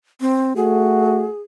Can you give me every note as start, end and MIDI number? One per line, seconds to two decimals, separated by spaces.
0.21 0.53 60
0.56 1.26 57
0.56 1.26 66
0.56 1.40 68